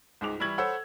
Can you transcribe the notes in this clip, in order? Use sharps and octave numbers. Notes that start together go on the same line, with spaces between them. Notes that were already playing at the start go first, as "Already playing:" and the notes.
C#2 G#2 G#4 D6 F7
E3 G3 E4 C#6 G#6 F#7
A4 C5 C#5 F#5 B5 E6